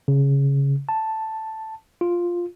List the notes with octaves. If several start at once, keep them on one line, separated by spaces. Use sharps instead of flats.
C#3
A5
F4